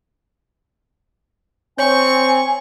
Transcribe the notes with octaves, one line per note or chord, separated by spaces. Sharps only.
C4 C#5 G#5 C#6 G6